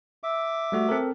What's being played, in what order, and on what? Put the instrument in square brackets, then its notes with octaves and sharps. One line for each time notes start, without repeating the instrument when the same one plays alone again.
[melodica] E5 D6
[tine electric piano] G3 A3 F#4
C4 A4 A#4